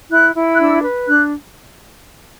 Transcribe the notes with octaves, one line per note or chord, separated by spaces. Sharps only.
E4 F#6
E4
F#6
D4 E6
B4
D4 F#6